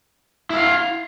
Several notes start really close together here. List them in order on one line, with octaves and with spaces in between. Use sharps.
E4 E5 F5